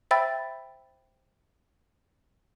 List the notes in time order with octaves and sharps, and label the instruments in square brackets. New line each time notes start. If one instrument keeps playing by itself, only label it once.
[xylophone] C5 E5 G5 B5 E6 A6